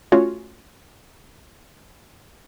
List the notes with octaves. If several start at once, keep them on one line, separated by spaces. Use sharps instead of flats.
A3 C#4 F4 F#4 C#5